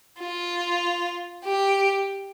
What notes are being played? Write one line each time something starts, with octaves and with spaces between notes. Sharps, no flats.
F4
G4